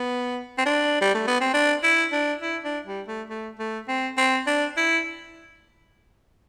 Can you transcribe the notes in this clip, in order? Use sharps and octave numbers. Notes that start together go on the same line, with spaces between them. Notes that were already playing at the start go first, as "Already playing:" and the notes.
Already playing: B3
C4
D4
G3
A3
B3
C4
D4
E4
D4
E4
D4
G3
A3
A3
A3
C4
C4
D4
E4